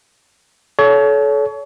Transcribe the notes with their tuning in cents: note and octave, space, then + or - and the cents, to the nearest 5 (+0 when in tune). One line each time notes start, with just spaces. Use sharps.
A4 -30 C#5 +30